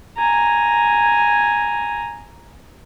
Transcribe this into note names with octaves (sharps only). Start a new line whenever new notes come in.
G#5 A#5